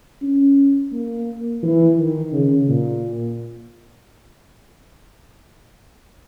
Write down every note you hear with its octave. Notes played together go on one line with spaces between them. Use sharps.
C#4
A#3
E3
D#3
C#3
A#2